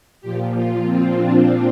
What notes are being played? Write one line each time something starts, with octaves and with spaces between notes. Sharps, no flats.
A#2 F3 G4
F4
C4
D4